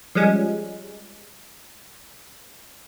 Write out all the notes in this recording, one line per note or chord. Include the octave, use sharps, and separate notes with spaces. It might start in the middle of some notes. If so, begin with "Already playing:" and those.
F3 G3 G#3 C#4